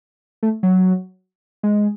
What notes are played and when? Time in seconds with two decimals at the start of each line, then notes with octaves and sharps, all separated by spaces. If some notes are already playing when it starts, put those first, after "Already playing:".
0.43 A3
0.63 F#3
1.63 G#3